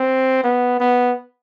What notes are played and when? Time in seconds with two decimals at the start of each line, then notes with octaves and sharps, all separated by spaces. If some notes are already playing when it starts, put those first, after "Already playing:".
Already playing: C4
0.44 B3
0.80 B3